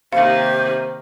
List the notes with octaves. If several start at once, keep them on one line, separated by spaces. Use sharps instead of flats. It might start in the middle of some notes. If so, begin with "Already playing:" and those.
C3 D#3 A#3 G4 F5